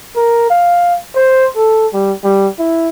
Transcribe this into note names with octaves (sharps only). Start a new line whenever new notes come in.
A#4
F5
C5
A4
G3
G3
E4